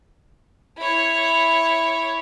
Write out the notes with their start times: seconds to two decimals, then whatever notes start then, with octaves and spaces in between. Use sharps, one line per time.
0.78 E4 C#5